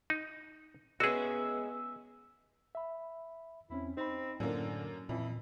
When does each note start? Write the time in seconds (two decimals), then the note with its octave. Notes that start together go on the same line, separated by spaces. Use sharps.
0.10 D#4
1.00 G#3 B3 C#4 F#4 G#4 E5
2.75 E5 B5
3.70 E2 C4 C#4 E4
3.97 C4 D#4 B5
4.40 F#2 A2 D3 F#3 A#3 C#4
5.09 F2 A#2 E3